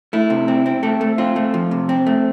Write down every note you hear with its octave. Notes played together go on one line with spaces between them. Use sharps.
A3 E4
C3
C4
C4
A3 A4
A3
C4 F4
A3
F3
C3
C4
A3